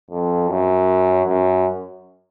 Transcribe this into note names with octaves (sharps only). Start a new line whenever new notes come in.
F2
F#2
F#2